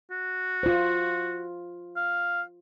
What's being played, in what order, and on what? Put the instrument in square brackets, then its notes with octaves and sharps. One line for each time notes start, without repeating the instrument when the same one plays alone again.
[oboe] F#4
[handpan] F4 C5
[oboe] F5